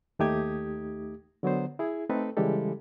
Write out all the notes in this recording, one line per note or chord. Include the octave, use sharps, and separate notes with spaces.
D#2 A3 D#4 G4 D#6 G#6
D3 F#3 B3 C5
E4 G#4
A3 C4 D#4 A4 B4
C#3 E3 G3 G#3 G4 A4